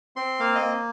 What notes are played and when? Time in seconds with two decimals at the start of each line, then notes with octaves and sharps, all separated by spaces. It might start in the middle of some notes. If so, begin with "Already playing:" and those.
0.16 C4 C6
0.40 A#3 F5
0.55 D#5
0.61 A#3